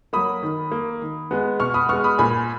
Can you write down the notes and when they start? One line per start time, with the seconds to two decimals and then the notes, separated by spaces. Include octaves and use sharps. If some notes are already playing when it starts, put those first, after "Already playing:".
0.13 F#3 A#3 B5 D#6
0.43 D#3
0.71 A#3
1.02 D#3
1.31 G#3 B3
1.60 B2 C#6 F6
1.74 B5 D#6
1.89 G#3 B3 C#6 F6
2.04 B5 D#6
2.18 A#2 G#5 B5